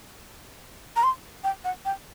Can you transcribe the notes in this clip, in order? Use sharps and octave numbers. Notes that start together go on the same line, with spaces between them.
A#5
C6
G5
F#5
G5